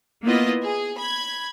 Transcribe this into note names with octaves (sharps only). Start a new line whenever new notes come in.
A#3 B3 E4 F4 B4 D#5
G#4
B5 G#6